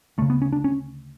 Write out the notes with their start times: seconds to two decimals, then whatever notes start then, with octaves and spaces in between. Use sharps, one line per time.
0.18 D2 A3
0.22 C#3
0.30 B3
0.42 C#4
0.53 D4
0.64 C#4